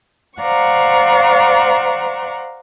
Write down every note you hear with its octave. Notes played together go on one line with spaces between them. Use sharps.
C5 D5 F5 F#5 A#5 C#6